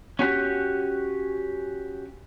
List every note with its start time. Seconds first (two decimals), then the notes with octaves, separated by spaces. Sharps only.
0.19 C#4 F#4 G4